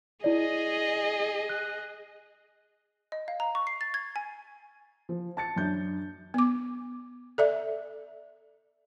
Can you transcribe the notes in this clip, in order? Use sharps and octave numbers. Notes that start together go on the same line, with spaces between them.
E4 G#4 D5 D#5
F#6
D#5
F5
A#5
C#6
C7
A6
G#6
G#5
F3
A5 A6 C#7
F#2 D4 G6
B3 D6
A4 D5 E5